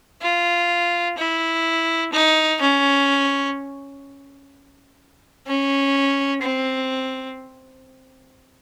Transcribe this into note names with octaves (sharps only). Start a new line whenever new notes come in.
F4
E4
D#4
C#4
C#4
C4